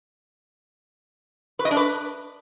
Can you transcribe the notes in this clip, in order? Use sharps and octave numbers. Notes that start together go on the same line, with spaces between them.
B4
D#5
D4
B4